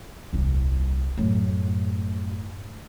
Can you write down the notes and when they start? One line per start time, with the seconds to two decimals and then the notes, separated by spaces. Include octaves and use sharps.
0.33 D#1 C2
1.18 F#2 A2